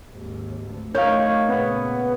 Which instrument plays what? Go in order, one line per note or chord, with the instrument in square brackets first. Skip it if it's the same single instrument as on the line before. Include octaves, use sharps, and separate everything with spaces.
[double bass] G#1 D#2
D2
[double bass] A3 D#4 [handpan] A#4 C#5 [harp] F5 G6
[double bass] A#2 C#3 [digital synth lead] B3